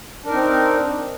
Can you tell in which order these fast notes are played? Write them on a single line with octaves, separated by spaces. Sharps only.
D4 A#4 D#4 C4